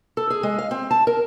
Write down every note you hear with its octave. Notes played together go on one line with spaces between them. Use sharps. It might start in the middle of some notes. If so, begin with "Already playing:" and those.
A4
G#4
G#3
F5
C4
A5
A#4